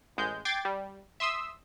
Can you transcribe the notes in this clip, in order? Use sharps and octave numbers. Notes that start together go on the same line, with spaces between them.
A1 G#3 G6
G5 D6 G#6 A6 C7
G3
E5 C6 D#6 E6